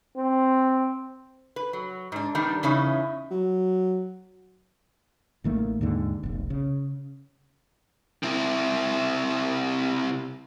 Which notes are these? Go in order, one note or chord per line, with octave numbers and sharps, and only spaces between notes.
C4
B4
F#3
G#2 D4
D#3 G3 B3 D4 D#4
E2 C#3 C#4 D#4 E4
F#3
A1 D#3 A3 A#3
D#2 G#2 D3
F1 B1
C#3
C3 E4